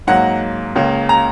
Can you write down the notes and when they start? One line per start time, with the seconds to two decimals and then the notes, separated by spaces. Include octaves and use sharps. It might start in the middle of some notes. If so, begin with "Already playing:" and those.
0.07 G#2 F#3 A#3 F#5
0.76 C#2 C#3 A#3
1.09 A#5